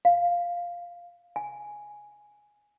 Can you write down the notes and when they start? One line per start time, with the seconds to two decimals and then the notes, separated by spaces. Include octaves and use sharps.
0.05 F5
1.36 G#5